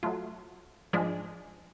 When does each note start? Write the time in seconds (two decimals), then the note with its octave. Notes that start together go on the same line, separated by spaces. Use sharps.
0.03 F#3 A3 F4
0.93 G#2 F3 G#3 D4